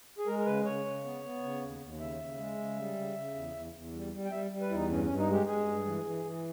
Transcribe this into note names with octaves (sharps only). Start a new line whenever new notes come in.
G#4
G#3 A#4
A#4
C#3 B4
C#3 C#5
C#3
B3
B3
C#3
D#2
D#2
C#3 E5
C#3
G#3
C#3
G3
C#3
C#3
E2
E2
E2
G3
G3
G5
G3 E5
G3
B4
E2 D#4 E4
G2 C#4
G2 C#4
D#4
G#3 G4
G#3 G#4
G2
E3
E3
E3